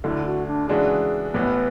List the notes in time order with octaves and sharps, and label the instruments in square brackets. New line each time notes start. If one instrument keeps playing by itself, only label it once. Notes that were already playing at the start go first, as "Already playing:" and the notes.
[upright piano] D2 D3 A3 [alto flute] E4
[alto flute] F#4
D4
[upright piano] C#3 E3 G#3 D4 F#4 [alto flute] G#4
[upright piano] A1 A2 E3 B3 [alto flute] B4